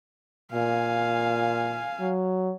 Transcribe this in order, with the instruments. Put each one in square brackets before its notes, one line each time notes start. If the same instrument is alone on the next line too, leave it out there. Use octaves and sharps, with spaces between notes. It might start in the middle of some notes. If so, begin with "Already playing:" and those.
[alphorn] A#2 [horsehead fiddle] F5 G#5
[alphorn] F#3